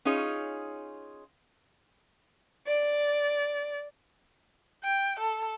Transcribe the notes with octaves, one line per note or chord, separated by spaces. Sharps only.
C#4 D#4 F4 G#4 C#5
D5
G5
A4